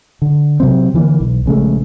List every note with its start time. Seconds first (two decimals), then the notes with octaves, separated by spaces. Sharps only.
0.22 D3
0.60 C3 F#3 C4
0.94 D3 E3 G3 A#3
1.20 B1
1.46 A#1 C#3 G#3 A3